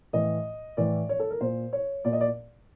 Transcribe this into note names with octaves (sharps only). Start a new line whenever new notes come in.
A2 E3 D#5
A2 E3 D5
C#5
A4
A#4
A#2 C5
C#5
A#2 D5
D#5
D5